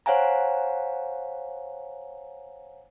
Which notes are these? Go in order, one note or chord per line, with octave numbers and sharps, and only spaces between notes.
C5 C#5 F5 F#5 G#5 A#5